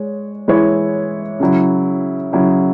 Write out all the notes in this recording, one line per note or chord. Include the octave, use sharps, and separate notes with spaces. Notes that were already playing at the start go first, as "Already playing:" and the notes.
Already playing: G#3 C#5
E3 G#3 E4 C#5
C#3 F#3 E4
C#3 F#3 E4